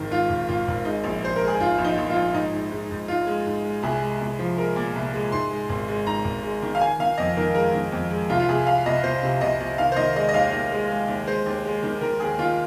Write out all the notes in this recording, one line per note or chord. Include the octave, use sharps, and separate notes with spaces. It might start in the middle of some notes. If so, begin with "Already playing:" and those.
Already playing: G#1 G#2 D#3
G#2 F4
G#1
G#1 F4
G#1
G#3 D#4
A#1
A#1 C5
A#4
G#3
G#4
G#2 F4
A#1
D#4
A#1
F4
A#1
G#2 D#4
G#2
G#2
G#2
G#2 F4
G#3
G#2
G#3
C2 G#4
G#3
C2
F3
G#3 A#4
A#2
C2
G#3
G#2 C6
G#3
G#1
G#3
G#2 A#5
G#1
G#3
D#3
F5
D#3 G#5
D#3 F5
F2 D#5
D#3 A#4
G#3 A#4
D#3
F2
G#3
C2 F4
F4
C2 G#4
C2 F5
C2 D#5
C2 C5
C3
C2 D#5
C2
D#3 F5
C5
D#3 D#5
G#3 D#5
D#5
D#2 F5
D#2
G#3
G#3
D#2
G#3 C5
D#2
G#3
D#3
D#3 A#4
D#2 G#4
D#3 F4